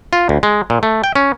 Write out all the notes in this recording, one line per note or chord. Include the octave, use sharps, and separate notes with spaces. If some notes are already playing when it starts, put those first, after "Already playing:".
F4
D2
G#3
A#2
A3
G5
C#4